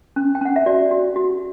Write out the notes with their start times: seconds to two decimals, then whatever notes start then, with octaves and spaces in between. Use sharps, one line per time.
0.16 C#4
0.35 G5
0.41 C#4 F#5
0.56 E5
0.66 F#4 D5
0.91 F#4
1.16 F#4